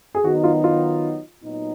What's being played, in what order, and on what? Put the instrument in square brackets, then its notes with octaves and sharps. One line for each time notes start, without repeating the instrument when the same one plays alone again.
[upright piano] G#4
[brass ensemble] D#3 F#3 B3 D#4 [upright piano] F#4
[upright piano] F4
F4
[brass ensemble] A#2 F#3 B3 D#4